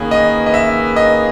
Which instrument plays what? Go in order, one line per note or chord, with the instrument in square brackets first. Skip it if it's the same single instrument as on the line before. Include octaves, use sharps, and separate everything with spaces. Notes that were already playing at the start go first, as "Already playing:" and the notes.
Already playing: [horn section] D#3 A#3 C#4 G#4 B4
[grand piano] D#5
D#5
E5
D#5